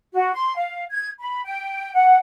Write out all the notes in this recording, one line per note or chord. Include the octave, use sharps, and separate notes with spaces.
F#4
C6
F5
G#6
B5
G5
F#5